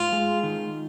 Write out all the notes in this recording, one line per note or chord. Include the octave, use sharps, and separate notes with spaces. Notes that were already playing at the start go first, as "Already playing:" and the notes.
Already playing: G#2 F4
G#3
D#3